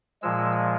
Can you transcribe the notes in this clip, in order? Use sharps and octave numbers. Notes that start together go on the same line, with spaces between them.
A#2 F3 G#3 E6